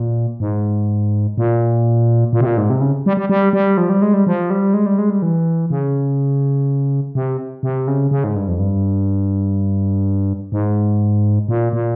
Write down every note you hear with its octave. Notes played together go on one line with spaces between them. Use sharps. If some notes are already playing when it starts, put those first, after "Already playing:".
Already playing: A#2
G#2
A#2
A#2
C3
A#2
G#2
C3
C#3
G3
G3
G3
G3
F3
G3
G#3
G3
F3
G3
G#3
G3
G#3
G3
E3
C#3
C3
C3
C#3
C#3
G#2
G2
F2
G2
G#2
A#2
A#2